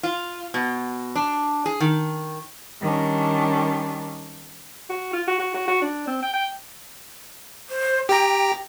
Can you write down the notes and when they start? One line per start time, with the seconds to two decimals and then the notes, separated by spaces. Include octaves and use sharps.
0.03 F4
0.54 B2
1.15 D4
1.66 G#4
1.80 D#3
2.81 D#3 G3 C#4 D4
4.90 F#4
5.13 F4
5.27 F#4
5.39 F#4
5.54 F#4
5.68 F#4
5.82 D4
6.07 C4
6.23 G5
6.34 G5
7.70 C5
8.09 G4 G5 A#5